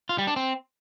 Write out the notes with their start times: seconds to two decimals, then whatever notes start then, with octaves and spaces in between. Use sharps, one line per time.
0.09 F4
0.18 G3
0.27 D4
0.36 C4